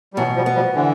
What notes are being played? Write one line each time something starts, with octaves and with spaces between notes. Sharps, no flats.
G3
B2 E3 F#3
F3 G3
B3
F3 G3
D3 E3